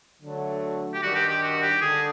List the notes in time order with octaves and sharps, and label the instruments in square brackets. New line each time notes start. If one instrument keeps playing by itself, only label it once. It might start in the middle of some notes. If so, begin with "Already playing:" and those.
[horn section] D3 F#3 A3
[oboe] G4
[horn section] G2 D#3 G3 [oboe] F#4
[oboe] G4
G4
F#4
G4
[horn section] D3 [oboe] G#4